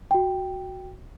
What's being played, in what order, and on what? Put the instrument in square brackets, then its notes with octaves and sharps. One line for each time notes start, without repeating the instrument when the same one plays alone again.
[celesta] F#4 G5